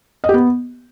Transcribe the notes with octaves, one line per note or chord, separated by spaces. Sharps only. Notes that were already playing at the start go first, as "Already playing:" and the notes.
D#5
G4
B3